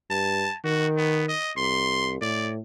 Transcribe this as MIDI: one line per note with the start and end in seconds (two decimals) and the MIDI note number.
0.10 0.46 43
0.10 0.57 81
0.64 1.33 51
0.64 0.87 66
0.97 1.24 59
1.28 1.52 75
1.57 2.21 36
1.57 2.14 84
2.21 2.59 45
2.21 2.52 74